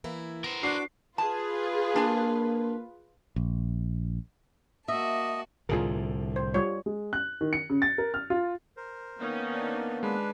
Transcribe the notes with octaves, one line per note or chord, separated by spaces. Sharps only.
E3 A#3 E4
B3 A#4 C5
D4 F#4 D6 C7
F4 G#4 B4 A5
A#3 D4 G#5
A#1
A#3 F#4 D#5 E5 A5
C2 A2 D3 F4 G#4 A#4
C5
G3 F4 C#5
G#3
F#6
D#3
C#7
C#3
A6
A#4
F6
F4
A#4 C5
D#3 A#3 B3 C#4 D#4
D4 D5
G#3 D4 B4